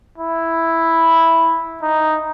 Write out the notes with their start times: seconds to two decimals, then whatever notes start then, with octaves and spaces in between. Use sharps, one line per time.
0.18 E4
1.82 D#4